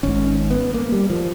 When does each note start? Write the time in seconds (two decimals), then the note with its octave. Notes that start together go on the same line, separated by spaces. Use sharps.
0.03 G#1 G#2 C#4
0.51 B3
0.74 A#3
0.92 G3
1.10 F3